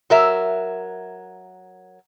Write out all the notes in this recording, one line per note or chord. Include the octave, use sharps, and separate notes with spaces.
F#3 A#4 E5